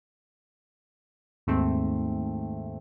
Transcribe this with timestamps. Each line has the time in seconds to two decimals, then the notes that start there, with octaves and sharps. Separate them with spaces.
1.47 D#2 G#2 A3 C4